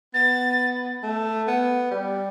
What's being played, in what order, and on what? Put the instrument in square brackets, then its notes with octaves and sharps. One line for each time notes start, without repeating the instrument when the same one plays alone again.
[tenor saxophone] B3 [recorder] A6
[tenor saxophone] A3
B3
G3